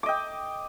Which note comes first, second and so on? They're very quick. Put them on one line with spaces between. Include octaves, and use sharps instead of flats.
D6 D#5 G5